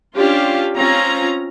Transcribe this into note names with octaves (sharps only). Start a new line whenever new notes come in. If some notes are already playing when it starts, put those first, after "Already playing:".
C#4 D4 F4 G4 F5
C4 C#4 F4 A#5